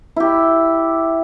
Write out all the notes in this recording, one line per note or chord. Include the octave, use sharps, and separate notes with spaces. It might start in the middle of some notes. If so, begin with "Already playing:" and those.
E4 G4